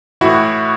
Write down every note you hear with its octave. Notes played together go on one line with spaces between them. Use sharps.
A2 E3 E4 F#4